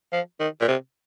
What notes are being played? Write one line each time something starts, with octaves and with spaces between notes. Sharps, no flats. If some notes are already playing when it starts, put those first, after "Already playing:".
F3
D#3
A#2
C3